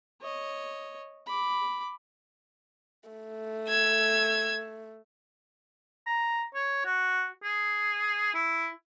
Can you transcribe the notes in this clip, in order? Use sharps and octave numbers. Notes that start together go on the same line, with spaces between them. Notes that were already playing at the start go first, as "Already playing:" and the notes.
C#5 D#5
B5 D6
A3
E6 G#6
A#5
C#5
F#4
G#4
E4